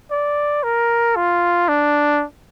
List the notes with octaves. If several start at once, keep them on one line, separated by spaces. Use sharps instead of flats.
D5
A#4
F4
D4